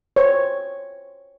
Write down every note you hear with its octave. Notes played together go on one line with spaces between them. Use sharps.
C5 C#5